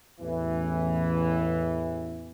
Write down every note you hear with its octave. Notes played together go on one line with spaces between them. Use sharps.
A1 E2 E3